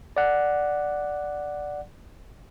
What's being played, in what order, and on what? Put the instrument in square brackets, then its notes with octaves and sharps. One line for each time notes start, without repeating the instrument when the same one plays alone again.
[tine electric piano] D5 F#5